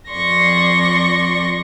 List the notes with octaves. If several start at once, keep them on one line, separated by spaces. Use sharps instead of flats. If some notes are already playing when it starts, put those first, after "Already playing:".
F2 D5 C6 C#6 A#6